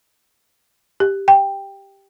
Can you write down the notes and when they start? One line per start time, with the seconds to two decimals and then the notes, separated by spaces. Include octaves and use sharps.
1.00 G4
1.28 G5